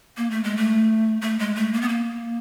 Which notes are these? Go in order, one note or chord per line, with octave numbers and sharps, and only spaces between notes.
A#3
A3
G#3
A3
A3
G#3
A3
A#3
B3
A#3